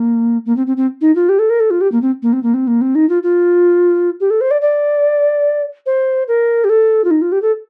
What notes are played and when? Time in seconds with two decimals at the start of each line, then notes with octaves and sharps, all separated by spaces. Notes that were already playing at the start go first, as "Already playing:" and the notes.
Already playing: A#3
0.46 A#3
0.56 C4
0.67 C4
0.77 C4
1.01 D#4
1.15 F4
1.29 G4
1.39 A4
1.50 A#4
1.60 A4
1.70 F4
1.81 G4
1.92 A#3
2.02 C4
2.22 A#3
2.33 C4
2.43 A#3
2.54 C4
2.67 A#3
2.81 C4
2.95 D#4
3.09 F4
3.23 F4
4.20 G4
4.30 A4
4.41 C5
4.51 D5
4.61 D5
5.86 C5
6.28 A#4
6.64 G4
6.69 A4
7.04 F4
7.11 D#4
7.21 F4
7.32 G4
7.42 A4